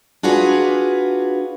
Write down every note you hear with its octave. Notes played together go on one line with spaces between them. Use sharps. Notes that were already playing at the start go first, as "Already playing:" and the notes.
D4 F4 F#4 G#4 B4